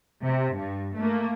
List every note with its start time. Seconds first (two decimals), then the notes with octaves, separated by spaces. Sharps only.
0.23 C3
0.56 G2
0.97 A3 A#3